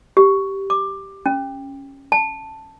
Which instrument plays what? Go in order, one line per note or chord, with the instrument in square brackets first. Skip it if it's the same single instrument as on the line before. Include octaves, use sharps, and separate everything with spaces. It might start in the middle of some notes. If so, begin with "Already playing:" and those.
[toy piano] G4
D6
C#4
A5